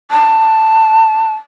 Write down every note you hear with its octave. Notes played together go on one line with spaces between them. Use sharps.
A5